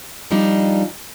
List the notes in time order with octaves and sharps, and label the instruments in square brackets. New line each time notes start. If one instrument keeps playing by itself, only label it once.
[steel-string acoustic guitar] F3 G3 D4 D#4